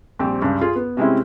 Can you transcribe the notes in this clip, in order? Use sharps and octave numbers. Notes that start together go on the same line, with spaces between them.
A#1 G3 C4 G4
C#2 G2
F4 G#4
B3
C3 G3 G#3 C4 C#4 E4